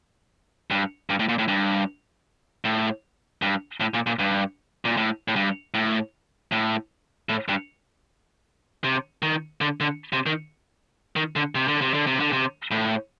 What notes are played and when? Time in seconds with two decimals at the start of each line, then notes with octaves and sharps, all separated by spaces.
0.71 G2
1.10 G2
1.19 A2
1.29 A#2
1.39 A2
1.48 G2
2.65 A2
3.42 G2
3.80 A2
3.94 A#2
4.07 A#2
4.19 G2
4.85 A#2
4.97 A2
5.28 A2
5.36 G2
5.74 A2
6.52 A2
7.29 A2
7.48 G2
8.84 C3
9.22 D#3
9.61 D3
9.80 D3
10.13 C3
10.26 D#3
11.16 D#3
11.36 D3
11.55 C3
11.68 D3
11.81 C3
11.94 D3
12.07 C3
12.20 D3
12.32 C3
12.71 A2